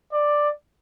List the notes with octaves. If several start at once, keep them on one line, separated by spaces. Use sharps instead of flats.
D5